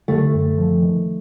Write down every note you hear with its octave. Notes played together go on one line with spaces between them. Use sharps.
D3 A3
F#2
F3
D#3